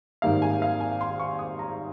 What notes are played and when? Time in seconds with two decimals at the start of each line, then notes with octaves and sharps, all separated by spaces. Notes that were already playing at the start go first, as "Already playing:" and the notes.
0.22 G#1 G#2 D#3 G3 A#3 F5
0.42 G#5
0.62 F5
0.80 G#5
1.01 C6
1.19 C#6
1.39 D#6
1.59 A#5